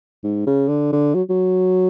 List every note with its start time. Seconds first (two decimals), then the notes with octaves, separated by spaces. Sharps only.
0.24 G#2
0.47 C#3
0.69 D3
0.93 D3
1.15 F#3
1.30 F#3